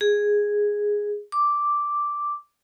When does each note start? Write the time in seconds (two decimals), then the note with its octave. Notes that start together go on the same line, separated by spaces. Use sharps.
0.01 G#4
1.32 D6